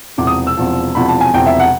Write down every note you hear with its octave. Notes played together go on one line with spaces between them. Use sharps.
E1 E2 C3 F3 D6
D#6
E6
E1 E2 C3 F3
E1 E2 C3 F3 B5
A5
G#5
E1 E2 C3 F3 G5
E5
F#5